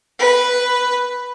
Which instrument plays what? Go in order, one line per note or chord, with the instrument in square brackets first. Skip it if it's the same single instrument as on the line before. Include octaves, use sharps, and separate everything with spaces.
[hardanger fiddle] B4